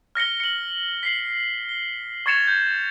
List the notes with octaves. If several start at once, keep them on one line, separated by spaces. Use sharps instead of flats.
F6 A#6 C#7 G7
C#7 F#7
B6 C7 F#7
G7
C#6 G#6 A6 C#7 E7 F7
G6